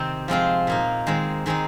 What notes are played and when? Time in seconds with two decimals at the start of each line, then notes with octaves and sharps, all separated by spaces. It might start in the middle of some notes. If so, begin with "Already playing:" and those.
Already playing: C3 D#3 C4 D#4
0.28 F3 G#3 C4 F4
0.67 A#2 A#3 D#4
1.07 D#3 G#3 C4
1.46 D#3 G#3 C4 D#4